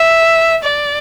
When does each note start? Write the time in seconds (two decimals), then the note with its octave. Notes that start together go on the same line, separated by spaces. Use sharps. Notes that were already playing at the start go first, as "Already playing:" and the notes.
Already playing: E5
0.64 D5